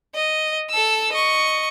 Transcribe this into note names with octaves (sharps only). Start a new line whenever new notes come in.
D#5
A4 E6
D#5 C#6